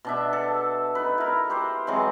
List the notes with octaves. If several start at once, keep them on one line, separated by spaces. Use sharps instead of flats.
B2 D4 E5
A4
D#4 B4
E4 A#4
G4 B4 C5
E3 F#3 G#3 C4